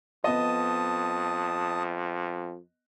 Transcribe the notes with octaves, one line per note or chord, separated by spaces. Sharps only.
F2 B3 D#5 A5 D#6